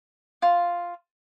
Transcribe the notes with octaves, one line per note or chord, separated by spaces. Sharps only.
F4